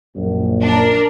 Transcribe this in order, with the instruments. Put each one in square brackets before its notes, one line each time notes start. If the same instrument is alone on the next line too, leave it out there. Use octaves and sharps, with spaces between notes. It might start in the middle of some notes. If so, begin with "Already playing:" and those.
[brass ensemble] A#1 F#2
[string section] D4 A#4